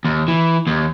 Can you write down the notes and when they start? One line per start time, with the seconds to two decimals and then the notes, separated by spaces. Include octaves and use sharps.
0.05 D#2
0.28 E3
0.67 D#2